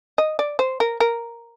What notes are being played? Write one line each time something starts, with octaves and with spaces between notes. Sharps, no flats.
D#5
D5
C5
A#4
A#4